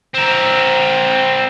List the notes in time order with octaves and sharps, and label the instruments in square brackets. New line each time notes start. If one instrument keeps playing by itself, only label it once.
[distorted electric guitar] C4 A#4